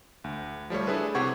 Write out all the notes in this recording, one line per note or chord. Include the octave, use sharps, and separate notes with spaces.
D2
F3 G3 A3 C#5
D4 E4 G#4 A4 B4
C3 G4 C5 F#5 C#6 G#6